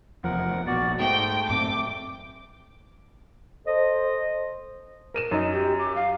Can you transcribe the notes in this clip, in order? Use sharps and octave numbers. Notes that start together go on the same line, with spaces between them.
F1 E2 F3 A#4 F#5
A#1 B2 F#4 D5
G#2 A3 G5
F#2 A2 C4 D6
A4 C5 D#5
A#4 D#7 E7
F#2 D#4
G4
D6
F5